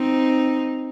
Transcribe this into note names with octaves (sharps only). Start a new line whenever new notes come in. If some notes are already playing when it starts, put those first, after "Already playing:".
Already playing: C4 D#4